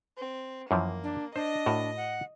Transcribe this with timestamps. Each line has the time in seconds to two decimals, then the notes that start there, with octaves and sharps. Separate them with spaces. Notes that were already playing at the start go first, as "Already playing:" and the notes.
0.17 C4
0.71 F#2 E3 F3 A#3
1.03 D4
1.36 D4 C5 D#5 A#6
1.66 A2 F#4 A#4
1.97 F#5